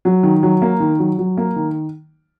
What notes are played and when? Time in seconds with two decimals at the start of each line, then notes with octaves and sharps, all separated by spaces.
0.05 F#3
0.23 D#3
0.43 F#3
0.62 A#3
0.80 D#3
0.99 F#3
1.19 F#3
1.37 A#3
1.56 D#3